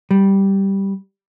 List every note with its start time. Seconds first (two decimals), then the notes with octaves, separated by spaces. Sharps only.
0.11 G3